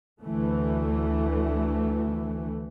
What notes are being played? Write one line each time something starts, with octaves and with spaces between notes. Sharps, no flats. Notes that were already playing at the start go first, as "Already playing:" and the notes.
D2 E3 A3